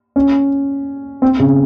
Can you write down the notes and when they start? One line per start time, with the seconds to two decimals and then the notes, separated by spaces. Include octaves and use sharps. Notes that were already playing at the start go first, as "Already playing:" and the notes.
0.16 C#4
1.22 C4
1.39 C#3